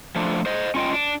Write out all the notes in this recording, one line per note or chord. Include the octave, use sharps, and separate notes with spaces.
F3 A3 D4
C5 D#5
C#4 F4 D#5 G5
D4